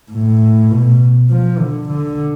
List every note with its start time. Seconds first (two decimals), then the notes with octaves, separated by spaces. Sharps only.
0.12 A2
0.71 B2
1.29 F3
1.59 D3
1.89 D3